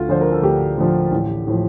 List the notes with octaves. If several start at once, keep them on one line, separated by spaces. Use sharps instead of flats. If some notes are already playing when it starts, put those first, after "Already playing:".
Already playing: D2 F4
D3 F3 C5
A#4
A4
D2 G4
D3 F3
A1
A2 F3